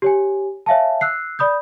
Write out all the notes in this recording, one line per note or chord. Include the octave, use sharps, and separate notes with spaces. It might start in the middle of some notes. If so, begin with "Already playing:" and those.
G4 C#5 G#5
C#5 E5 F5 G#5 A5
E6 F#6 C7
D5 B5 D#6 G6